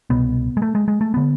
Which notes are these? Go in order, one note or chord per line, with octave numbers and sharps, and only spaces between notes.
C2 B2 B3
G#3
A3
G#3
G#3
A3
D3 B3